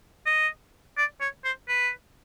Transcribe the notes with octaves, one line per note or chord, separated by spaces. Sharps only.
D#5
D5
C#5
C5
B4